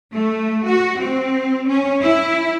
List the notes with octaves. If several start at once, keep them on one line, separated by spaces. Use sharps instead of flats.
A3
F#4
C4
C#4
E4